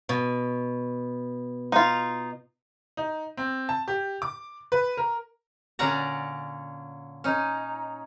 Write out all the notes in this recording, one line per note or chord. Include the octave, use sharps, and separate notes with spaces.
B2
D#4 F4
D#4
C4
A5
G4
D6
B4
A#4
A#2 D3 C#4 D5 F#5 A#5
C#4 D#4